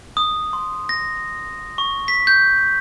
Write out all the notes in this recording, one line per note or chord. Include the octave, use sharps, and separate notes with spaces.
D#6
C6
A#6
C#6
B6
G6